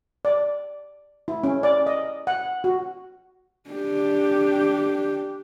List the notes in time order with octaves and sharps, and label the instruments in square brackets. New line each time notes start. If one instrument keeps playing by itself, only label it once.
[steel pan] D5
E4
C#4
D5
D#5
F#5
F#4
[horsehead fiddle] D4 G4